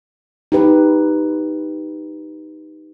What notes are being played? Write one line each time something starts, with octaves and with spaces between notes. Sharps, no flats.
D#4 G4 B4